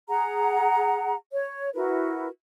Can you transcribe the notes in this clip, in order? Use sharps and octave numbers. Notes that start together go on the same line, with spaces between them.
G#4 F#5 A#5
C#5
E4 F#4 A#4 B4